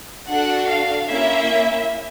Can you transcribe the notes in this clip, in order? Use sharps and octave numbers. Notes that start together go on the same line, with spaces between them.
D4 F#4 A4 F#5
F5
A#3 C#4 E4 E5